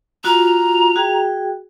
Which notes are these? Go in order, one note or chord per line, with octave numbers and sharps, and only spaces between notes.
F4 F#4 A#5
F#4 G#4 G5